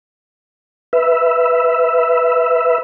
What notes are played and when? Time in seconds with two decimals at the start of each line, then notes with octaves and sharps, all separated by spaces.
0.93 B4 E5